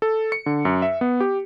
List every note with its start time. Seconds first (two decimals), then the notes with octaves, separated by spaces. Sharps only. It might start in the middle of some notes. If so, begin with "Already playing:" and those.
0.02 A4
0.32 C#7
0.46 D3
0.65 F#2
0.82 E5
1.01 B3
1.20 G4